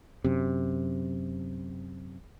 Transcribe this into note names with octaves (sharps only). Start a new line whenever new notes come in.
F#2 C3